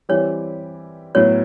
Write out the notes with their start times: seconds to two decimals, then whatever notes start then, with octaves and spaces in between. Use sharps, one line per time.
0.09 E3 G3 C4 E4 G4 C#5
1.15 A2 F#3 B3 E4 C#5